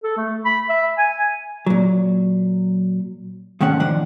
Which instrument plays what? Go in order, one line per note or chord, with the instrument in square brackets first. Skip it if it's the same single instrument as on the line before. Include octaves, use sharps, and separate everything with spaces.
[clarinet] A4
A3
B5
E5
G#5
[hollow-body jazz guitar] A#2 F#3
G#2 D#3 A3 C#4 F#5
A2 D#3 F3 D4 F#5